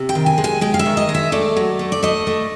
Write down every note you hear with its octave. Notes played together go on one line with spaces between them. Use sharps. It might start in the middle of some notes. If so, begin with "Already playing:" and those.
Already playing: C3
G5
D#3
G#5
G#3
G#5
G#3 G5
F5
E5
D#3
D#5
G#3
E5
A3 D5
F#3
A3
D5
A3 D#5
A3